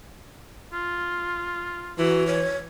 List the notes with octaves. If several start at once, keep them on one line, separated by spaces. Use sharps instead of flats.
F4
E3 F#4
C#5